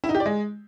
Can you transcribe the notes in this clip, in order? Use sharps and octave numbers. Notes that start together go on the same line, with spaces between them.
E4
D#4
G4
D5
G#3